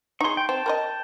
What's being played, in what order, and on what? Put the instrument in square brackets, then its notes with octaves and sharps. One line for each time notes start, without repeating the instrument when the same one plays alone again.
[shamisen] D#4 G#4 [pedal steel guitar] C6 C#6
[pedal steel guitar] G5
[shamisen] C4 [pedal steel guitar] G5 A5
[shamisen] A#4 B4 D#5